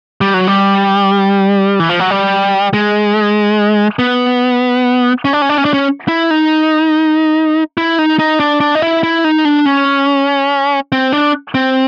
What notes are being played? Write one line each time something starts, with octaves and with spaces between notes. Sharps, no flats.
G3
F#3
G3
E3
F3
F#3
G3
G#3
B3
C#4
D4
C#4
D4
C#4
D4
C#4
E4
D#4
E4
D#4
D#4
D4
D4
D#4
E4
E4
D#4
D4
C#4
C4
D4
C4